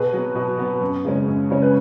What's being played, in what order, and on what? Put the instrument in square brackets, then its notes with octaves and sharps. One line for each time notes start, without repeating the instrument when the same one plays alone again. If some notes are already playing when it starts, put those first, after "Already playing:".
Already playing: [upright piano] B2 G#4 B4
F#3 B3
B2
F#3 B3
F#2
C#3 G#3 C#4
F#2
C#3 G#3 C#4 C#5
B4